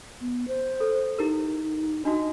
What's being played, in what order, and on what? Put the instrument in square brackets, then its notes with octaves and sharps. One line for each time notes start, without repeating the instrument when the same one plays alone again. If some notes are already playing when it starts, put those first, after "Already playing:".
[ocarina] B3
C5
[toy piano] A4
[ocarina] D#4 [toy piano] E4 G4 A#4
[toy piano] D4 D#4 F#4 [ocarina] D#5